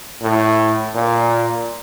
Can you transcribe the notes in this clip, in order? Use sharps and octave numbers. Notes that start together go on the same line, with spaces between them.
A2
A#2